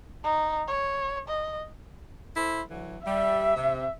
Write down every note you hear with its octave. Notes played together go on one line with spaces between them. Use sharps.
D#4
C#5
D#5
E4 A4 C5
D3 E3 F#3
G3 E5
C3